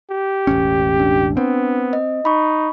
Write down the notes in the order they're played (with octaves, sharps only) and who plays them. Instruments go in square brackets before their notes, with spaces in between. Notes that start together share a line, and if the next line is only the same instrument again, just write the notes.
[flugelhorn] G4
[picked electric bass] E1 A1 C#4
[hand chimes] D4
[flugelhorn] B3 [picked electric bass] C4
[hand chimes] D#5
[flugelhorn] D#4 [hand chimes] B5 C#6